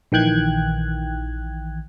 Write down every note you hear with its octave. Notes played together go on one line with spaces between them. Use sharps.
A#1 D#3 E3 G5 F#6 G#6